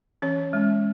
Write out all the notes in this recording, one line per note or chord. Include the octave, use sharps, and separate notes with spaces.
E3 C#4 C#5
G#3 C#4